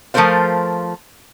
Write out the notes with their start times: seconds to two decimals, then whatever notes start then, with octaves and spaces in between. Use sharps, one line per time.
0.14 F3 A3 F4 A#4 C5 F5